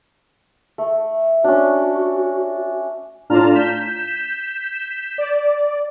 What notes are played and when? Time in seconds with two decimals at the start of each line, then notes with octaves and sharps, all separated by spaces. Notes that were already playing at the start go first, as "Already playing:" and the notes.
0.78 A3
1.44 C#4 D4 F#4
3.29 A2 D4 F4 A5 A#5 F6
3.55 G6 B6 E7
5.18 D5